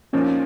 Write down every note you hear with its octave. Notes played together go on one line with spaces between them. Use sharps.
A#2 F3 A#3 C#4 D#4